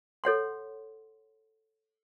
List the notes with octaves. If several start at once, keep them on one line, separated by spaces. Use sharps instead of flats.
A4 C#5 F#5 C6